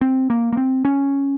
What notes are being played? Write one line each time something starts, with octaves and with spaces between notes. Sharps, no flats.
C4
A#3
A#3
C4
C#4